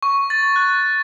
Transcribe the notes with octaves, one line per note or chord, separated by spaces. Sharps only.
C#6
A6
F#6